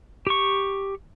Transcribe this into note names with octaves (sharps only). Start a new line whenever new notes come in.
G4 C#6